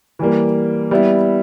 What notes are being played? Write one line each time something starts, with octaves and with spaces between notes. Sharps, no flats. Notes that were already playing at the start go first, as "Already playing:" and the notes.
E3 G3 A#3
G3 B3 E4